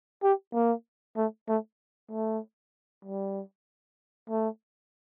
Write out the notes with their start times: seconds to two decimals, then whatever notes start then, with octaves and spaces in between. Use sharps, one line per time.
0.23 G4
0.54 A#3
1.17 A3
1.48 A3
2.11 A3
3.05 G3
4.30 A3